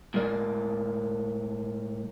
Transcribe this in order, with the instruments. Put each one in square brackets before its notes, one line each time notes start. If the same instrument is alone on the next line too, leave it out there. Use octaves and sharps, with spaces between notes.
[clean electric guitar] A2 G#3 A#4 D5